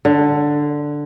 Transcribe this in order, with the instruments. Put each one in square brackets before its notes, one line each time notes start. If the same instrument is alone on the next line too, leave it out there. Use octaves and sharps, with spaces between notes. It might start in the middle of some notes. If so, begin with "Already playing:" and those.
[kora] D3